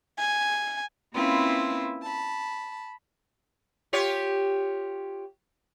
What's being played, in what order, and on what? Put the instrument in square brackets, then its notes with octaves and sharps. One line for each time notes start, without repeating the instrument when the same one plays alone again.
[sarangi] G#5
[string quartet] A#3 C4 C#4 E4 F4 B4
A5 B5
[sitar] F4 G4 C#5